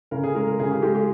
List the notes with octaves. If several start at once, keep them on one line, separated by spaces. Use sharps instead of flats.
C#3 A#4
G#4
G#3 A#4
A#4
C#3 G#4
G4
G#3 G4
G4